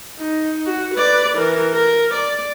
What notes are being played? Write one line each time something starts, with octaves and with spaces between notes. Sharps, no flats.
D#4
F#4
B4 D5
E3 A#4
A#4
D5